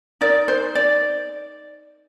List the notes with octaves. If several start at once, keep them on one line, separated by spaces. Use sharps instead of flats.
D#4 A#4 D5
C5
D5